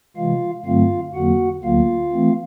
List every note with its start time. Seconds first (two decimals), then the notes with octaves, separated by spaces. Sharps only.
0.16 C3 E3 G#3 F4 F5
0.65 G2 D3 F#3 A3 C4 F4 F5
1.14 F2 D3 F#3 A#3 F#4 F#5
1.63 D2 D3 F#3 A#3 F4 F5
2.12 E3 A3 C4